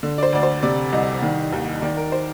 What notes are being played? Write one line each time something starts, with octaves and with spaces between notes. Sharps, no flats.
D3
D5
C5
D2 D5
C5
C3 D5
C2 D#5
D#3
D#2
D#3 D5
A#4
C5